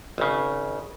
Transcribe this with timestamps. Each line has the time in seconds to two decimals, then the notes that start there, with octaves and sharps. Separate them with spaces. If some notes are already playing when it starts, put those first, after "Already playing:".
0.18 G#1 C#3